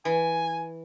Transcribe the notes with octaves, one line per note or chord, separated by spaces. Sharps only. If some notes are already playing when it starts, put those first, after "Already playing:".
E3 G#5